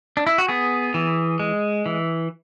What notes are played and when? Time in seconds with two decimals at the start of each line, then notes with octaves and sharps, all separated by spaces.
0.17 D4
0.27 E4
0.38 F#4
0.48 B3 G#4
0.94 E3
1.39 G#3
1.86 E3